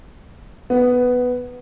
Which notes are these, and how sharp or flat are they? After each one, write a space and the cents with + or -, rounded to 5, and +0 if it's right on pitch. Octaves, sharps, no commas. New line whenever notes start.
B3 +5